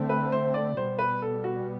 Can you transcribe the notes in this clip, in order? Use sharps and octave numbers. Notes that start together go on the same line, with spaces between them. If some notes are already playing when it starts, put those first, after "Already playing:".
Already playing: D3 A3 C4
B4
C5
D5
B2 G3 B3 C5
B4
A4
F#4